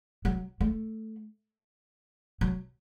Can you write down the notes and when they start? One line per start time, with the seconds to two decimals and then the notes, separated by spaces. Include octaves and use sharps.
0.25 F#3
0.61 A3
2.41 F#3